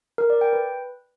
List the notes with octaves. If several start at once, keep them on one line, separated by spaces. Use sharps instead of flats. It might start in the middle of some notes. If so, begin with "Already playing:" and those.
A#4
D5
G5
B4